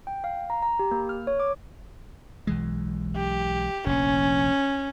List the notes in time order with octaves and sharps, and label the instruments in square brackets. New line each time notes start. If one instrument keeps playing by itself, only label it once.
[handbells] G5
F5
A#5
A#5
G4
A#3
F6
C#5
D6
[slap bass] B1 E3 G#3
[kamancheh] G4
[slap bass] F1 A#1 [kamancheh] C#4